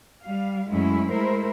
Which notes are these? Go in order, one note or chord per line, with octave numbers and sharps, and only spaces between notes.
G3 F5
F#2 G#3 A3 C#4 E4
G#3 A3 E4 A#4 C5